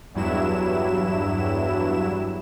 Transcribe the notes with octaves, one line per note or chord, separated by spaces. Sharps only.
E2 G2 F#3 E4 E7